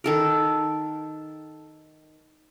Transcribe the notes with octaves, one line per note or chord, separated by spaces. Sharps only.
D#3 A4 A#4